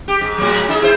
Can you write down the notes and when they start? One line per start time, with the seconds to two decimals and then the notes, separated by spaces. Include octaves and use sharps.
0.08 G4
0.21 G#2
0.38 A2 F#3
0.69 D#4 G#4
0.82 E4 C5